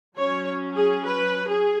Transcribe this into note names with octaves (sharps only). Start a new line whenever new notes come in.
F#3 C#4 C#5
G#4
B4
G#4